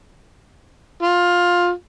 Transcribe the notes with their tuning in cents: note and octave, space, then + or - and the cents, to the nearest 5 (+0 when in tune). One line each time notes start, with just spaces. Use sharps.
F4 +15